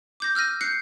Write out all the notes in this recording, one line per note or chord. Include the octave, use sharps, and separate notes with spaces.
D6 G6 A#6
E6 F6 G6 A#6 D#7
F#6 G6 C7 C#7